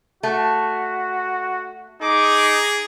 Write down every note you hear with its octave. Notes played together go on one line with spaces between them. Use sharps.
A3 F#4
D#4 G#4 D6